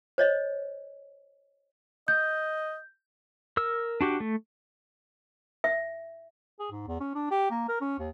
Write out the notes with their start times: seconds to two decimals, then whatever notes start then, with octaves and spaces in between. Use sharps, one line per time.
0.18 C5 C#5 D#5
2.08 D#5 G6
3.57 A#4 E6
4.01 D4 F#4 G4
4.20 A3
5.64 E5
6.60 G#4
6.71 G#2
6.87 E2
7.00 C#4
7.15 D4
7.31 G4
7.51 A#3
7.68 A#4
7.81 C#4
7.99 D#2